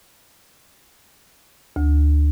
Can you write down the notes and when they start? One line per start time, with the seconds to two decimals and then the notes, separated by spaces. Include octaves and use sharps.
1.76 D2